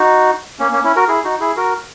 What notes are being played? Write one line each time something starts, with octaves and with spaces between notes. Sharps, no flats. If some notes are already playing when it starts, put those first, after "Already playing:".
Already playing: D#4 F#4
A#3 C#4
A#3 C#4
C#4 E4
F#4 A#4
E4 G#4
D#4 F#4
E4 G#4
F#4 A#4